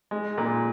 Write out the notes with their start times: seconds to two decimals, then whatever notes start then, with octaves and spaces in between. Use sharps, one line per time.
0.11 G#3
0.38 A#2